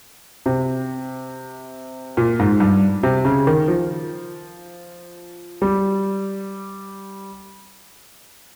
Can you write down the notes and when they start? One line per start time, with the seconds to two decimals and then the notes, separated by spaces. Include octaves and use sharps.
0.46 C3
2.17 A#2
2.39 G#2
2.60 G2
3.03 C3
3.25 C#3
3.47 D#3
3.68 F3
5.62 G3